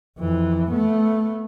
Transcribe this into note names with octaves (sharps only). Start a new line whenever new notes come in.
F2 E3
A3 B3